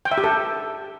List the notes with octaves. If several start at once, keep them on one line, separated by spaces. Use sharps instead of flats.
G5
E5
G4
A4